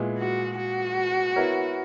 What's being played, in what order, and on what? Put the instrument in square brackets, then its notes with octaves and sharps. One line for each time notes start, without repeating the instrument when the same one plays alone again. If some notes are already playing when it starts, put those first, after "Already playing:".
Already playing: [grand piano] A#2 G#3 B3 E4 G#4
[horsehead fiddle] F#4
F#4
[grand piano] B3 E4 A#4 C#5